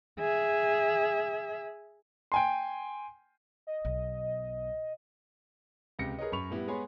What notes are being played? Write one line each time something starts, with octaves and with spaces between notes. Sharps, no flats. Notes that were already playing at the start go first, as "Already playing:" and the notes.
G#4 E5
G5 G#5 C6
D#5
B1
C#2 C3 G5 A#6 C#7
G#4 A#4 B4 C#5 D#5
F#2 B5 C#6 F7
A2 G3 B3 E4 G4
G#3 B3 C#5 G#5 B5 C6